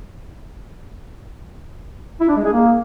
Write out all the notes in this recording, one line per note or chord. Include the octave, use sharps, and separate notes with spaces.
E4
D4
G#3
G#4
A#3